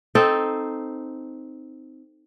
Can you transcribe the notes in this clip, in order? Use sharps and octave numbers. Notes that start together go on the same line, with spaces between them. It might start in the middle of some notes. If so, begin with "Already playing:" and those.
C4 D#4 A4